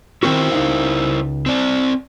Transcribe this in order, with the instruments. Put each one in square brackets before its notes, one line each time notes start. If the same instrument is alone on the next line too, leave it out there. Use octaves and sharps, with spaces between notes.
[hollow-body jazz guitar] D#3 C4 F#4 [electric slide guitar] E4 A#4 C5
[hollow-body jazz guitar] C#2 D#4 F5
[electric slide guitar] C4 D5